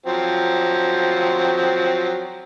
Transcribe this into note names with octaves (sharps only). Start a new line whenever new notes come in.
F3 F#3 C4